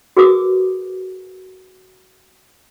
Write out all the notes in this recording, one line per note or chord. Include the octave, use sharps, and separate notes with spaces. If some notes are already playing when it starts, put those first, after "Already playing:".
F#4 G#4 A#4 B4 D6 D#6